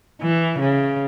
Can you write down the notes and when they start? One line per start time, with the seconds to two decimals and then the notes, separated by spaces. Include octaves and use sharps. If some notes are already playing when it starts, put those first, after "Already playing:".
0.21 E3
0.59 C#3